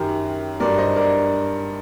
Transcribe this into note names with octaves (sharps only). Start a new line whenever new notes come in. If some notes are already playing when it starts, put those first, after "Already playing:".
Already playing: F#2 D#3 F#3 G4 A#4
G2 F#3 A#4 D5
C5 D#5
A#4 D5